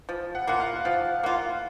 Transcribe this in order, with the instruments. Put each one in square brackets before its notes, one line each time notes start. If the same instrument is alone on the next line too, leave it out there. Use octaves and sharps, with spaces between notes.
[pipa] F3
[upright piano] F#5
[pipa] A#3 F4 [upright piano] F#5
[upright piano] F5
[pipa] F3 [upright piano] F5
[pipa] A#3 F4 [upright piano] F#5